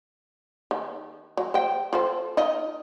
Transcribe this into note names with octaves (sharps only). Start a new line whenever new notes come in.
D#3
F#3
C5 G5
F4 A4 C5
D#4 F4 D#5